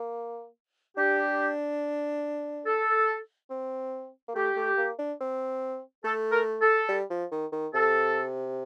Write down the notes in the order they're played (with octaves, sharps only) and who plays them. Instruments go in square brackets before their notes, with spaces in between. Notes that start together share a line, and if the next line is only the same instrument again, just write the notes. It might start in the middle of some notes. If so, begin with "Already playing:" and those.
Already playing: [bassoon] A#3
[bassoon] D4 [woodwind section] G4
[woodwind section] A4
[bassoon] C4
A#3
[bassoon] A3 [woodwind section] G4
[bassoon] A3
A#3
D4
C4
[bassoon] A3 [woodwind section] A4
[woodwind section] A#4
A4
[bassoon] G3
F3
D#3
D#3
[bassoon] C3 [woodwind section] A4